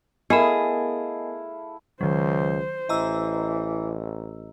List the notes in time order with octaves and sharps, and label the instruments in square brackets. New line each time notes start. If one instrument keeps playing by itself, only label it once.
[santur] A3 E4 F5 [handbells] B3 A#4 [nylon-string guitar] G#4 [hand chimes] D#5 G#5
[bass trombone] C#2 [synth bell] D#3 F#3 [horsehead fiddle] C5
[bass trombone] A1 [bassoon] E3 [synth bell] D#5 A#5 E6